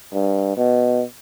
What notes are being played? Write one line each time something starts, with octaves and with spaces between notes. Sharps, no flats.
G2
B2